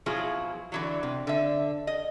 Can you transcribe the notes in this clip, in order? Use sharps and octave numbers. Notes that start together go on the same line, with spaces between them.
B2 F3 F#3 E4 F4 G#4
D3 E3 F#3
C3
D3 E5
D#5